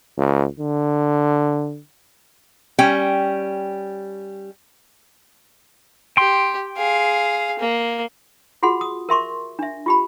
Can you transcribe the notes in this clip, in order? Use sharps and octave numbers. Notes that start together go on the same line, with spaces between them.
C#2
D3
G3 C#4 G5
G4 G5 C6
G#4 F5
A#3
F4 F#4 G#4 F#5 C6
D#6
A#4 E5 C6 C#6
D4 E5
F4 G4 B5